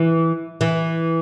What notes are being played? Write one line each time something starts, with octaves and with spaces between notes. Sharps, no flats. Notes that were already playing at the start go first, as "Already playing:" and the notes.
Already playing: E3
E3